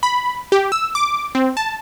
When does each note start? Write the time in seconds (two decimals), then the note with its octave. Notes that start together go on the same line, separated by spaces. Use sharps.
0.03 B5
0.52 G4
0.72 E6
0.95 D6
1.35 C4
1.57 A5